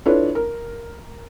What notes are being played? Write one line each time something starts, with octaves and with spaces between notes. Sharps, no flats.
D4 E4 F4 A4 B4 C#5
A#4